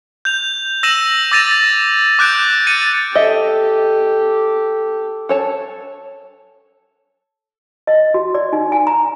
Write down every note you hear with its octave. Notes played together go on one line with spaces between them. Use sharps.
G6 F7
E6 A#6 D#7 E7 F#7
D6 E6 A6 A#6 D#7 F7
D6 F#6 G6 D7
A6 C#7 D#7
G4 A4 D#5 E5
A4 C#5 A5
D#5
F#4
D5
D#4
G#5
A#5